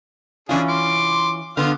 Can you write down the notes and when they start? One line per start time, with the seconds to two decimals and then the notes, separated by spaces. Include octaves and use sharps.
0.49 E3 C#4 D4 F4 G#4
0.69 C6 D6
1.57 D3 B3 F4 F5